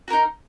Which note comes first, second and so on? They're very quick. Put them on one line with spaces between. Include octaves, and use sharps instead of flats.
F#4 A#4 D#4